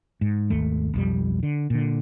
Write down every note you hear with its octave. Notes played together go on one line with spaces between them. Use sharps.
G#2
G#1 D#2 A3
B1 F2 G3
D3
A#2 D3